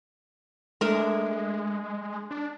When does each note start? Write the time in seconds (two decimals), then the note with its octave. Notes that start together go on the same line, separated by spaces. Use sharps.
0.81 G#3 A3 D4 A#4
2.31 D4